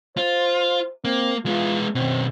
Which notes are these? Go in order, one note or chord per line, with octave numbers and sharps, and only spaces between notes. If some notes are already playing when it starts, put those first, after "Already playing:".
F4 C5
A#3 C4
G#3 B3 F4
B2 D#3 C4